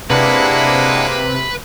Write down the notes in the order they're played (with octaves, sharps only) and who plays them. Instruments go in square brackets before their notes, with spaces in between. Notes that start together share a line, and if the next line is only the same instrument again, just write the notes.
[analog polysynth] C3 [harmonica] G#3 A#3 [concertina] D4 E4 F#5 [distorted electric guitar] B4